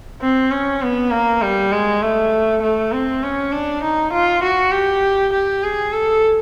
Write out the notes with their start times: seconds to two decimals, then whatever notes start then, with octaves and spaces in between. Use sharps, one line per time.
0.22 C4
0.51 C#4
0.82 B3
1.12 A#3
1.42 G3
1.72 G#3
2.03 A3
2.62 A3
2.92 C4
3.23 C#4
3.52 D4
3.83 D#4
4.13 F4
4.43 F#4
4.72 G4
5.33 G4
5.63 G#4
5.93 A4